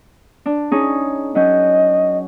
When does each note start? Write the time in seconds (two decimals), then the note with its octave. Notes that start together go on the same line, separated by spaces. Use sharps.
0.46 D4
0.72 C#4 D#4 G#4
1.35 F#3 C#4 D#5 G6